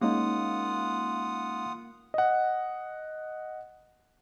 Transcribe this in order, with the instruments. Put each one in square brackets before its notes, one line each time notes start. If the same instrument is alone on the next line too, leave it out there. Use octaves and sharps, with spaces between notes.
[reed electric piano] G#3 C#4 D#4 [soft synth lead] A#3 [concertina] F4 F#5 D#6
[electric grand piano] D#5 F#5